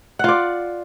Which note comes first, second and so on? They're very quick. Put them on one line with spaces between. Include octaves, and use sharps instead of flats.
F#5 F4 D5